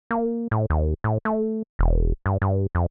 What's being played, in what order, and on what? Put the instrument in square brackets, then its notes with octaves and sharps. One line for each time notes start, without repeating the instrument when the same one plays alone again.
[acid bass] A#3
A2
D#2
A2
A3
E1
G2
G2
F2